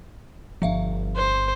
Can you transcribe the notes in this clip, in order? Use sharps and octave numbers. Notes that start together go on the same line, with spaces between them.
G1 F3 E5 F5
C5